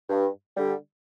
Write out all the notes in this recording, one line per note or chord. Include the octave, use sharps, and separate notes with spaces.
G2
D3 G3